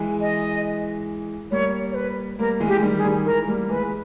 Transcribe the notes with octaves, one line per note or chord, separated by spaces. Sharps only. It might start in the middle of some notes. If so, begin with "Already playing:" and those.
Already playing: E3 G#3
D#5
G3 A#3 C#5
C#5
B4
G3 A#3 A#4
E3 G#3
G4
D#3 G3
G#4
D#3 G3
E3 G#3 A#4
G3 A#3
E3 G#3 B4